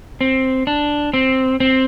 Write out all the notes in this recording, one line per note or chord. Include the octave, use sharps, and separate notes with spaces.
C4
D4
C4
C4